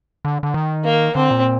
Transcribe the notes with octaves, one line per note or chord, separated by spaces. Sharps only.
D3
D3
D#3
A#3
D3 C4
A#2